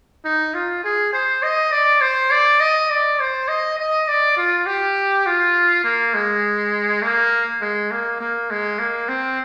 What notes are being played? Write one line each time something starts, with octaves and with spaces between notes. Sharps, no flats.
D#4
F4
G#4
C5
D#5
D5
C5
D5
D#5
D5
C5
D#5
D#5
D5
F4
G4
F4
A#3
G#3
A#3
G#3
A#3
A#3
G#3
A#3
C4